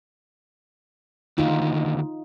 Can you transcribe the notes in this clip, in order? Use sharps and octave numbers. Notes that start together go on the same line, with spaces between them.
D2 D#3 D#4 F4